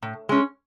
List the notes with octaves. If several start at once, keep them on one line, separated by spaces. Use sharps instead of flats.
A2
G#3 C#4